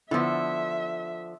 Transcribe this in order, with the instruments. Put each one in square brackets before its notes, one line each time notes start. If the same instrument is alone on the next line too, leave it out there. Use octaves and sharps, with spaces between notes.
[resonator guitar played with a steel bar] D3 F3 [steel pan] B3 E4 [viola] E5